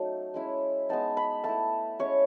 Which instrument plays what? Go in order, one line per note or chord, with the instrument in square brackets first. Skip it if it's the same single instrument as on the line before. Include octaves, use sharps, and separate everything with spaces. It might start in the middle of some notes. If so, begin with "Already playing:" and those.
Already playing: [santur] F#3 A3 C#4 D#4
G#3 C#4 E4
G#3 B3 D#4 A5
B5
A3 E4 A5
G#3 C#4 E4 C#5